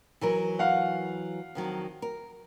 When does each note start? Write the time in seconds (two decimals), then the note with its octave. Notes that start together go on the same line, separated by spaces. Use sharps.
0.21 E3 F#3 A#4
0.59 F5 F#5
1.55 F2 D#3 F#3
2.02 A#4